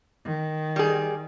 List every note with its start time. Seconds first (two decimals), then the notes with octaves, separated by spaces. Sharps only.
0.24 D#3
0.76 G3 G#4